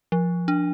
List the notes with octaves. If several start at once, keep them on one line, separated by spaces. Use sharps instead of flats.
F3
D4